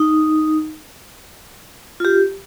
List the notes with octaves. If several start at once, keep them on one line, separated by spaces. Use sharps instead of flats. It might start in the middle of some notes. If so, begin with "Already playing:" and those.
Already playing: D#4
F4
G4